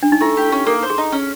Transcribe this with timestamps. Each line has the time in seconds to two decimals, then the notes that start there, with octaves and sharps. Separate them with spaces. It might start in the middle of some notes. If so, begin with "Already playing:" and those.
0.03 D4
0.12 D#4
0.21 A3 E4
0.37 G4
0.52 C#4
0.67 A#3 A4
0.82 C5
0.90 G#4
0.98 D#4
1.12 C#4